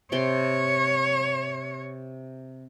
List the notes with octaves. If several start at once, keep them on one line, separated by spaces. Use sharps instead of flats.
C3 C#5 G5 C6